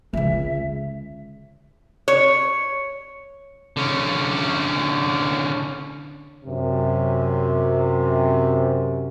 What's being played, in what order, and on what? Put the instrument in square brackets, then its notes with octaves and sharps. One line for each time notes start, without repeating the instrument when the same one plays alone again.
[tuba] C#2 [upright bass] D3 G#3 [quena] E5
[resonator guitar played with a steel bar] C#5
[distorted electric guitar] D3 C#4
[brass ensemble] F#2 C3